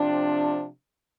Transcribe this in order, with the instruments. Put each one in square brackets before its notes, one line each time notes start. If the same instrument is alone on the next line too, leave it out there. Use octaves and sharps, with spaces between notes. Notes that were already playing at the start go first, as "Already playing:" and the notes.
Already playing: [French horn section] C3 F3 C4 D4